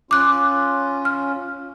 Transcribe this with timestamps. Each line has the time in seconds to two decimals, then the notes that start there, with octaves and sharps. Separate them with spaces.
0.11 C#4 F4 D6 F#6
1.05 F6